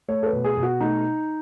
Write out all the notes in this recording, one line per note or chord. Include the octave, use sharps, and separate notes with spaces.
A3 C#5
A4
B4
B2
G#4
B2
F#4
A3 D#4